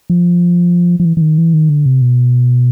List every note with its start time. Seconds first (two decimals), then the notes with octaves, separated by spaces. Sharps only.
0.10 F3
1.00 F3
1.05 E3
1.17 E3
1.21 D#3
1.38 E3
1.54 D#3
1.69 D3
1.86 C3
2.02 B2